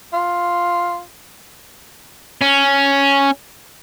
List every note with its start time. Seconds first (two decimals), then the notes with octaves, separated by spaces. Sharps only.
0.13 F4
2.41 C#4